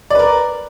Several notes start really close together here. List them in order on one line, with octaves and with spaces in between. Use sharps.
D5 B4 A#4